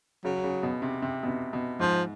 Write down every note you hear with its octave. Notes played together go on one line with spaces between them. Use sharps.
C#3 F#3
C#3
B2
C3
C3
B2
C3
B2
G#2 F3